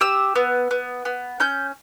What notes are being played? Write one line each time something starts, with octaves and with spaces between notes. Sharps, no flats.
G4 E6
B3
B3
B3
C#4 G6